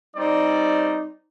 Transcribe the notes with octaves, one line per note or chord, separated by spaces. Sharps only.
G3 C4 D#4 D5